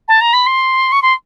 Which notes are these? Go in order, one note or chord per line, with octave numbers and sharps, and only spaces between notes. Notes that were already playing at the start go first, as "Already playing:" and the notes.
A5
A#5
B5
C6
C#6
C6